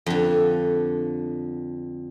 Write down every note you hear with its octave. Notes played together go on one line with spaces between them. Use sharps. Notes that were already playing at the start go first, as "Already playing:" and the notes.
F2 D3